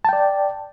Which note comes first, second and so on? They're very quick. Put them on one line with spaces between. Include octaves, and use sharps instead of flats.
A5 G5 D5